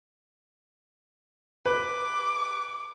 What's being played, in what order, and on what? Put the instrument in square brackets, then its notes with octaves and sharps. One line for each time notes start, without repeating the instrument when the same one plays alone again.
[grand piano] B4 [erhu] D6